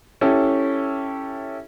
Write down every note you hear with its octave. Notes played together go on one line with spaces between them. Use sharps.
C#4 E4 G4 A4